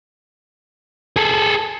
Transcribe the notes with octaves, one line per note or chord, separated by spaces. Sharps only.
G#4 A4